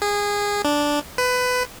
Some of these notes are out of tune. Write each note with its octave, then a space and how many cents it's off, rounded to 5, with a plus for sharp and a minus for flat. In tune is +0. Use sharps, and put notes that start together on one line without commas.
G#4 -20
D4 -5
B4 +20